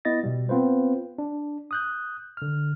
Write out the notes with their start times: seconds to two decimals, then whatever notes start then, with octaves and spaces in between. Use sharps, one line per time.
0.05 B3 E4 D#5 A6 A#6
0.24 B2 G3
0.49 B3 C4 F4 B4 C5
1.18 D4
1.71 D#6 F#6 G6
2.37 D3 F6